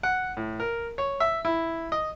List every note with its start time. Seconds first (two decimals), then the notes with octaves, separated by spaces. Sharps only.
0.03 F#5
0.37 A2
0.60 A#4
0.98 C#5
1.20 E5
1.45 E4
1.92 D#5